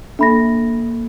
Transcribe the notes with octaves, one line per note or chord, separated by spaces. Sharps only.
A#3 D4 A4 E5 B5 A#6